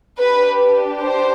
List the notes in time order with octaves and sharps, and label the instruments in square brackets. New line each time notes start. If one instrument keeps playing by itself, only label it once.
[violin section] D4 G4 B4
C5